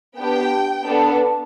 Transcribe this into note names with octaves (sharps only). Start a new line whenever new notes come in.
B3 D4 G4 G5
B3 D4 A4